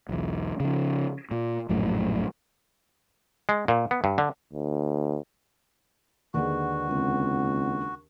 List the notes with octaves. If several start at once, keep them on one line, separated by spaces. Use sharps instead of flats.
B1 E2
C#3 F3
A#2
A#1 F#2 A2 F#3
G#3
A#2
B3
G2
D3
D2
D#2 D3 G#3 F#4 B4 D5 F#5
C#2 C4 F#5